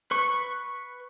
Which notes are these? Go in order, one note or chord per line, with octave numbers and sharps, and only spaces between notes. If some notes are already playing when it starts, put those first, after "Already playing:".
B4 C#6